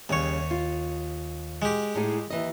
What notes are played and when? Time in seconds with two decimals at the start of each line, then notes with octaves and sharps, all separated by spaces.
0.09 D#2 C#3 G3 C#5
0.51 F4
1.62 G#3 G4
1.95 A2 D#4 G#4
2.30 D#2 E3 D#5